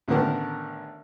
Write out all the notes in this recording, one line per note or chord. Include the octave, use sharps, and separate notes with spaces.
A1 D3 D#3 B3 D4 A#4